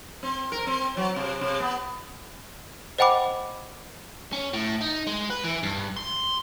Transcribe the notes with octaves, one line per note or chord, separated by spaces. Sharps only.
C4
A#4
C4
F#3
C3
C3
B3
C5 D#5 F#5 G5 B5 D6
C#4
A2
D#4
G#3
B4
E3
G2
C6